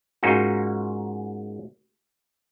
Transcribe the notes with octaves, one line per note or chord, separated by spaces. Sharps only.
G#2 A#3 C#4 D#4 F4 F#4